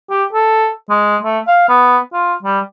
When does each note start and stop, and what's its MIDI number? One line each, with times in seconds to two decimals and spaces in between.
0.10 0.24 67
0.33 0.70 69
0.89 1.17 56
1.23 1.39 57
1.47 1.68 77
1.69 1.99 59
2.13 2.33 65
2.43 2.60 55